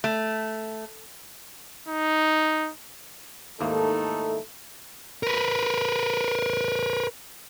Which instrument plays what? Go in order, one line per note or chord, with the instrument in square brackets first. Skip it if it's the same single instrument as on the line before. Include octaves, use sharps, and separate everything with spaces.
[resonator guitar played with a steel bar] A3
[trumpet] D#4
[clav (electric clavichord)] D#2 G#2 A#3 [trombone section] A3 D#4 E4 [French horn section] A4
[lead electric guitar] A#4 B4